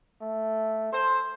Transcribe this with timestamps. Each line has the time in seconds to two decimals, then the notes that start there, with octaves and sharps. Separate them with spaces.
0.21 A3
0.92 A4 C5